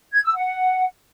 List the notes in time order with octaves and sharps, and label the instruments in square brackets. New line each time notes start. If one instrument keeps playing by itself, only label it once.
[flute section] G#6
E6
F#5